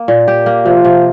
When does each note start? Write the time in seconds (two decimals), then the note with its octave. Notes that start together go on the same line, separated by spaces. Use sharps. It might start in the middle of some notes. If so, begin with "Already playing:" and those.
Already playing: A#3
0.08 A#2
0.28 G4
0.46 A#3
0.66 C3 F3 F4
0.85 C3